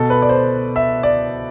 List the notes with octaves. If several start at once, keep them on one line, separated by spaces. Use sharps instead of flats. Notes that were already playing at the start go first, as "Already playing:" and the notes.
Already playing: B2 A4
B4
D5
C5
E5
D5